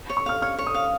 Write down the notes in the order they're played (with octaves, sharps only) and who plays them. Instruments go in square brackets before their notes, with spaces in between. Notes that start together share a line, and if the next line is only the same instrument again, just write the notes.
[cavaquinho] C#5
[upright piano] C#6
[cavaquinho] F5 [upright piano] F6
[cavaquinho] C#5 [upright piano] F6
[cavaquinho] C#5
[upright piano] D#6
[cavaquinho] F5